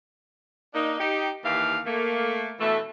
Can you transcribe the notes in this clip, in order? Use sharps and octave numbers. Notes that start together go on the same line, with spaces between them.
A#3 D4 D#4
D#4 G4
D#2 E3 G4 F5
A3 A#3
B2 E3 A3